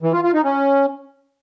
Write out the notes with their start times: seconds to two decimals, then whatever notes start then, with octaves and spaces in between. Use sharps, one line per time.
0.02 E3
0.13 F4
0.23 F4
0.34 D#4
0.44 C#4